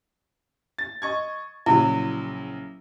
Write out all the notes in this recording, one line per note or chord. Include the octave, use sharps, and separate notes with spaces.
A6
D#5 C#6 G#6
A#1 C#3 F#3 E4